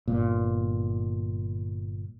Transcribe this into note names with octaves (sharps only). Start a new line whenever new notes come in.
G1 A#2